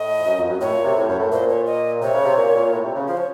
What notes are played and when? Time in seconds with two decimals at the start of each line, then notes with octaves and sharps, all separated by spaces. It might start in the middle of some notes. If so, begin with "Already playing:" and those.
Already playing: A2 D#5
0.19 F2
0.26 F#2
0.37 F2
0.50 F#2
0.61 A2 C#5
0.73 A#2
0.84 C3
0.96 A2
1.08 F#2
1.19 A2
1.32 A#2 C5
1.49 C#5
1.66 D#5
2.02 C3 C#5
2.13 C#3
2.25 C3
2.37 A#2
2.55 A#2
2.72 A2
2.84 C3
2.95 C#3
3.08 F3 C5
3.17 C#5